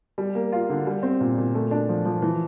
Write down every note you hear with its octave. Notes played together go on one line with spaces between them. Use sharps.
G3
A#3
F4
D3
G3
C4
A#2
A#2
A3
D4
F3
F3
E3